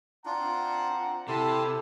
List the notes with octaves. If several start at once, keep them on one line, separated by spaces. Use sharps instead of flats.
C4 D4 F4 F#5 A#5
C3 E4 G4 A4 A5 C6